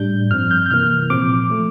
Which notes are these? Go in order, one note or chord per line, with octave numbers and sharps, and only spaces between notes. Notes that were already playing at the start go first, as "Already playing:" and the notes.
Already playing: A2 G3 D4 G6
G2 F3 C4 F6
G6
G6
C3 E3 A#3 F6
A#2 F3 C4 D6
F3 A3